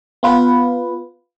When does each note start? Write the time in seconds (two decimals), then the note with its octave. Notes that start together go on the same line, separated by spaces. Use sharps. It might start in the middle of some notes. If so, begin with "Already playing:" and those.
0.23 B3 F4 B4